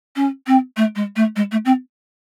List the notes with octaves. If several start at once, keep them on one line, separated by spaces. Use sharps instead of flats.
C#4
C4
A3
G#3
A3
G#3
A3
C4